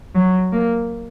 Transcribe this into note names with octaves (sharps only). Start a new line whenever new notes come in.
F#3
A#3